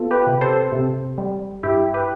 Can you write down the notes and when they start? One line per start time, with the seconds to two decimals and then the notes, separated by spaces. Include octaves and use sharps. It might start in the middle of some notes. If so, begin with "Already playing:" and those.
Already playing: B3 F4 A4
0.11 G4 B4
0.27 C3
0.41 A4 C5
0.72 C3
1.18 G3
1.63 G2 E4 G4
1.94 G4 B4